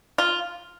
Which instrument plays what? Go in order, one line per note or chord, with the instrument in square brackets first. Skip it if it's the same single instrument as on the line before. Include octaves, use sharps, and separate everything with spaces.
[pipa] F4